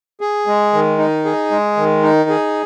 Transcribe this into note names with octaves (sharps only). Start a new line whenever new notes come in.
G#4
G#3
D#3
D#4
G#4
G#3
D#3
D#4
G#4